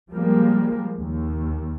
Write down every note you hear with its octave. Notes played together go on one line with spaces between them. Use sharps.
F3 G3 G#3 A#3
D#2